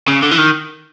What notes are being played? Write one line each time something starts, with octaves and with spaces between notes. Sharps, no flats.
C#3
D3
E3
D#3